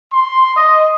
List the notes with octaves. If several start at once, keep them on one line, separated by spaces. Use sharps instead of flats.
C6
D#5